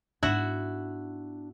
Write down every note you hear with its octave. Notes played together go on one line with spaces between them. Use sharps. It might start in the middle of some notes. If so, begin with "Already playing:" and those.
G#2 B3 D4 E4 F#4